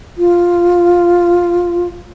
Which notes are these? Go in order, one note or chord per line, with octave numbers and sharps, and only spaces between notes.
F4